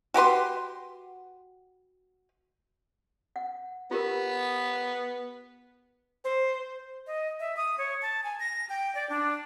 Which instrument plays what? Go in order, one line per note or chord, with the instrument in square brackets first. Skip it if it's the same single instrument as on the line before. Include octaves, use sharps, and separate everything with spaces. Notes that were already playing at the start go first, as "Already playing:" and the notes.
[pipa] F#4 G4 B4 C6
[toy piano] F#5
[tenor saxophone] B3 [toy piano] F4 G4 A#4
[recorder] C5
[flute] D#5
E5
D#6
C#5
A5
G#5
A#6
G5
D5
D4